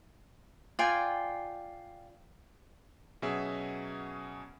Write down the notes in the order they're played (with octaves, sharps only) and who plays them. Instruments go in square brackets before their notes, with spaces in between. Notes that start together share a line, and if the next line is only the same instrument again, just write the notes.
[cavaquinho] F4 D5 G5 G#5
[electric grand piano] B2 F#3 C#4 G#4 E5